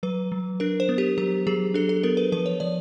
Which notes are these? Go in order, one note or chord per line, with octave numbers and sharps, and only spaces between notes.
F#3 B4
F#3
D4 A#4
C5
B3
G4
F#3 G4
F#3 G#4
D4 A4
A4
B3 A#4
B4
F3 B4
C#5
F3 D5